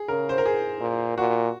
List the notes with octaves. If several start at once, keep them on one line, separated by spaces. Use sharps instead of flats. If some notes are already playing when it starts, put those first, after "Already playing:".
Already playing: G#4
C#3 A#4
C5
A#4
G#4
A#2
A#2 F#4